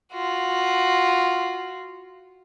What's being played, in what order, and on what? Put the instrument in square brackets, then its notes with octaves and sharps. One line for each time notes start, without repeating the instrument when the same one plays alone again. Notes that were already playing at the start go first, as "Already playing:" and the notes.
[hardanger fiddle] F4 F#4